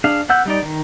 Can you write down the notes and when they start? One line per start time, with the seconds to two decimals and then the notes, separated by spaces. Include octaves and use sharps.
0.04 D4 G#4 F5
0.29 B3 F#5 E6 G6
0.46 G3 D#4 D5
0.62 D#3